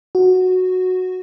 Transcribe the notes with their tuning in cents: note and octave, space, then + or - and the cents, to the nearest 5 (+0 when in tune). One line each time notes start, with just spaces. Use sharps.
F#4 -5